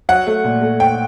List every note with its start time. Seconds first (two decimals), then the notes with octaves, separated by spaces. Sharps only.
0.09 F#3 F#5
0.27 A3
0.44 A#2
0.62 A3
0.80 A3 G5